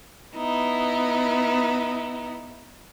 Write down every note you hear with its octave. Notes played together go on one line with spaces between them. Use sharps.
B3 D#4 E4